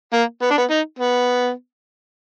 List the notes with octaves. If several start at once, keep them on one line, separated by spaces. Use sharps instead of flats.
A#3
B3
D4
B3
D#4
B3